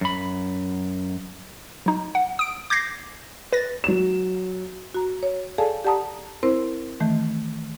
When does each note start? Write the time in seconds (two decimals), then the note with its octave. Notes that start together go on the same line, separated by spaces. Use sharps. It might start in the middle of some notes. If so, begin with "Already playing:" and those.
0.01 F#2 B5
1.86 F#3 D#4
2.15 F#5
2.39 D#6 D7
2.70 D6 G6 G#6 A#6 C7
3.53 B4 A6 A#6
3.84 F#3 E7
4.94 F#4 A#5
5.23 C#5
5.58 G#4 A4 D5 F5 G#5 A5
5.85 G4 D5 F#5 A5 A#5 D#6
6.43 C4 E4 A#4 C5
7.00 D#3 E3 A3